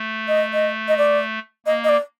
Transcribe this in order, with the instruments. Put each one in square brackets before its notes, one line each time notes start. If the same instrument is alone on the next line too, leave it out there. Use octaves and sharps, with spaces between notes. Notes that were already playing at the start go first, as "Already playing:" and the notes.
Already playing: [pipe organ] A3
[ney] D#5
D#5
D#5
D5
[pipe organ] A#3 [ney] D#5
[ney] D#5
D5